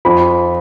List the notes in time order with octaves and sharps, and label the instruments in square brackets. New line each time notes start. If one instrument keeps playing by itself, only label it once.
[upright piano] F2 F3 B5